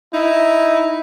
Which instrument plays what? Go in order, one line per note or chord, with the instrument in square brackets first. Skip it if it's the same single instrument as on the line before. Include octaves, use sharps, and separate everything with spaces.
[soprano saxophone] D#4 [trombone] E4